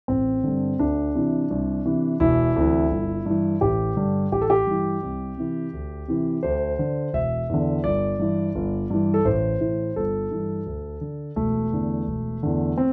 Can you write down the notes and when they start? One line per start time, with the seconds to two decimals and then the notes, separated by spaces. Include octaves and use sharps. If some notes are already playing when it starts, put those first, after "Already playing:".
0.08 A1 C4
0.44 G2 D3
0.79 D2 D4
1.15 C3 E3
1.50 C2
1.85 C3 E3
2.20 E1 E4
2.56 D2 C3 E3
2.90 G1
3.26 G2 E3
3.61 A1 G4
3.97 G2 D3
4.32 A1 G4
4.41 A4
4.50 G4
4.67 G2 E3
5.02 C2
5.37 C3 E3
5.73 D2
6.08 C3 E3
6.43 D2 C5
6.79 D3
7.13 E1 E5
7.49 E2 D3
7.84 G1 D5
8.19 G2 E3
8.55 G1
8.90 G2 E3
9.14 A4
9.25 A1 C5
9.61 A2 E3
9.96 G1 A4
10.31 G2 E3
10.66 D2
11.01 D3
11.36 E1 A3
11.73 E2 D3
12.07 E1
12.43 E2 D3
12.78 C4